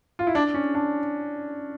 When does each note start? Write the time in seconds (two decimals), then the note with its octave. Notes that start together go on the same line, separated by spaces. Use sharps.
0.19 F4
0.27 E4
0.35 D4
0.54 C#4
0.75 D4